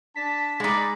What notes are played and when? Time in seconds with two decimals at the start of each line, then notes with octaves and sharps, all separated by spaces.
0.16 D4 A5 B6
0.60 G#3 D#4 F#4 D5 B5